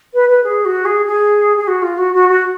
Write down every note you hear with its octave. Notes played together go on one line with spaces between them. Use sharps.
B4
B4
G#4
F#4
G#4
G#4
G#4
F#4
F4
F#4
F#4
F#4